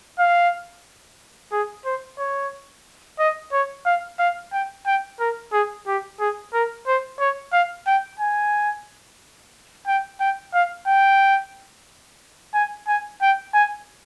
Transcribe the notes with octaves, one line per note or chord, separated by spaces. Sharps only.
F5
G#4
C5
C#5
D#5
C#5
F5
F5
G5
G5
A#4
G#4
G4
G#4
A#4
C5
C#5
F5
G5
G#5
G5
G5
F5
G5
G#5
G#5
G5
G#5